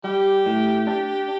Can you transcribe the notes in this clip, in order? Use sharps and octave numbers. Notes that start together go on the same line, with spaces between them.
G3 G4
A2
D4